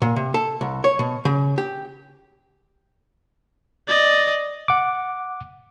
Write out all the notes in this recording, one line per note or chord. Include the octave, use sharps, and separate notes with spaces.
A#2
C3
A4
C2
C#5
B2
C#3
G4
D5 D#5
F#5 D6